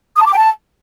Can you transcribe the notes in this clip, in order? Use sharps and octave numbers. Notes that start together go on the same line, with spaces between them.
D#6
A5
D6
G5
A5